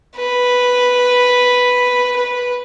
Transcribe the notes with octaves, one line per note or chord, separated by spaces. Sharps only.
B4
B4